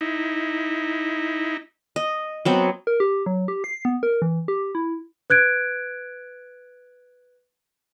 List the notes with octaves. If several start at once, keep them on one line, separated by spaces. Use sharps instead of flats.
D#4 E4
D#5
F#3 B3 C4
A#4
G4
F#3
G4
C7
B3
A#4
E3
G4
E4
B4 F#6 G#6 D7